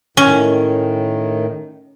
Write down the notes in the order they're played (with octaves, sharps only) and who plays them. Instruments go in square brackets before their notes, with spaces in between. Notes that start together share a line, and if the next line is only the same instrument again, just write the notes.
[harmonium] A2 D#3 [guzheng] C#4